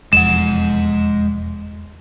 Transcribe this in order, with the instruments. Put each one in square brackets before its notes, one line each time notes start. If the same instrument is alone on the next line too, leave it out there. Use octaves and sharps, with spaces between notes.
[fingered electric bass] E1 F2 [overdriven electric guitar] G#3 F#5 [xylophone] E7